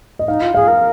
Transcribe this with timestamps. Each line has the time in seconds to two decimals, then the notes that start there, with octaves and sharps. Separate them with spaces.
0.19 D#5
0.27 D#4 F5
0.41 F4
0.54 G#4 F5
0.68 A#4